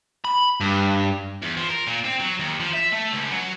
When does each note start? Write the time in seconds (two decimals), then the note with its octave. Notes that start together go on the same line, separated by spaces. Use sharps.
0.25 B5
0.60 G2
1.42 E2
1.57 F3
1.69 A#4
1.87 A#2
2.05 C4
2.20 F#3
2.39 D#2
2.60 F3
2.73 E5
2.92 A3
3.12 C#2
3.31 F#3